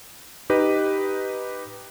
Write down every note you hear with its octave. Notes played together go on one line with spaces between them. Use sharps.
D#4 G4 B4 D#5